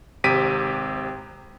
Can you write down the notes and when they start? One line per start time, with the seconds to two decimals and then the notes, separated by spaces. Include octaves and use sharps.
0.24 G#1 C3 G4 B6 D7 D#7